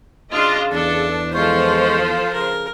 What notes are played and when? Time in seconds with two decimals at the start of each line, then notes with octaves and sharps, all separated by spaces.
0.33 C#3 D4 F4 D#5
0.72 E2 D4 A4
1.35 F3 G#3 F4 A4 C5 C#6 G6
2.34 C#3 A#4